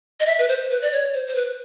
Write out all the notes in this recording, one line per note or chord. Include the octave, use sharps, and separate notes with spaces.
D#5
E5
B4
C5
B4
D5
C#5
C5
C5
B4